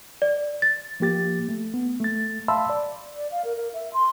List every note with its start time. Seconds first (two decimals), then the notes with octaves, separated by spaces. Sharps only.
0.22 D5
0.62 A6
1.00 F3 A#3 G4 A6
1.49 A3
1.74 B3
2.00 A3 A6
2.48 E5 F5 A5 B5 C6 E6
2.70 D5
3.16 D5
3.31 F5
3.45 A#4
3.57 A#4
3.74 E5
3.93 C6